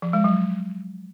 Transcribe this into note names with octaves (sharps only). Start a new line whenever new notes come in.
F3
G#3
F#3